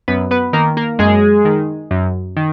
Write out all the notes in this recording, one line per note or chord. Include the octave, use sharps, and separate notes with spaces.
F#2 B3 B4
B3 B4
D#3 A#3 A#4
A#3 A#4
F#2 G#3 G#4
D#3
F#2
D#3